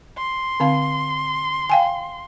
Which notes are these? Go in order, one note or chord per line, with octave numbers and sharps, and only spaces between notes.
C6
D3 C4 F5
F5 G5 G#5